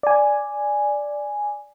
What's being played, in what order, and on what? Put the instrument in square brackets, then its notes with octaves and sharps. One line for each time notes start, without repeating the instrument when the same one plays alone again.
[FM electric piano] D5 G#5